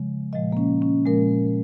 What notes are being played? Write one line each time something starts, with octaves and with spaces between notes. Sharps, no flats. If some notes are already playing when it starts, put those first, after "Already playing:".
Already playing: C#3 F3 G#3
A#2 F3 G#3 D#5
A#3
C#4
C#4
A#2 F3 G#3 A#4